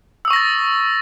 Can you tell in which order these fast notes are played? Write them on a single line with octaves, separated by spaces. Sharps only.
E6 D#6 C#6 A#6 A6